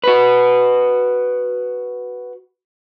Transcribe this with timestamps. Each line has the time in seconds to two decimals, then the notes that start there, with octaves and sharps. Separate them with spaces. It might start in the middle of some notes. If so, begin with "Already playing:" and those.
0.04 F#4 B4